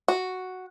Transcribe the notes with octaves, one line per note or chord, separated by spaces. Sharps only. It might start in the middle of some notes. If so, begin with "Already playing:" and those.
F#4